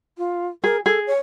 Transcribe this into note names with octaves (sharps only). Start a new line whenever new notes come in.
F4
G#4 A#4
G#4 A4
C#5